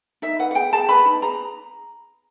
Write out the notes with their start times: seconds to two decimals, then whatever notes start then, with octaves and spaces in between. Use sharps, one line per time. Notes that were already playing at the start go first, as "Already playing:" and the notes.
0.22 D#4 E5
0.39 B4 F#5
0.51 F#5
0.55 G#4 G5
0.73 G#4 A5
0.89 B4 B5
1.05 D#4
1.22 G#4 A#5